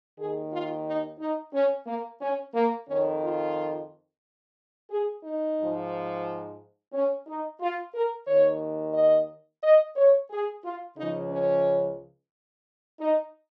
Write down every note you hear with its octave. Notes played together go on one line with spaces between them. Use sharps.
D#2 D#3 G#4
F4
D#4
D#4
C#4
A#3
C#4
A#3
F2 D#3 C#4
F4
G#4
D#4
G#2 F3
C#4
D#4
F4
A#4
D#2 D#3 C#5
D#5
D#5
C#5
G#4
F4
C#2 C#3 F3 D#4
C#4
D#4